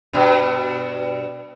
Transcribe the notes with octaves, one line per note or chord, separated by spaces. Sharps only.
G2 B2